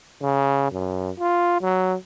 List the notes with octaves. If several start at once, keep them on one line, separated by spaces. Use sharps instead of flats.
C#3
F#2
F4
F#3